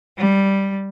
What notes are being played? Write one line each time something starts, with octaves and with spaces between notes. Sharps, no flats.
G3